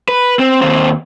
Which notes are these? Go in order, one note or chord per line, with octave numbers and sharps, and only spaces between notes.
B4
C4
D#2 C4